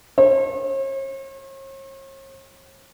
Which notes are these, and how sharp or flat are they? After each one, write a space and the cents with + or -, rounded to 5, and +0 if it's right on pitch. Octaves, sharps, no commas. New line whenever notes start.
C#5 -45